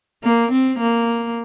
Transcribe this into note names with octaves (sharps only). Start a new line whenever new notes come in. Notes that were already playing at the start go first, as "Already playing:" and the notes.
A#3
C4
A#3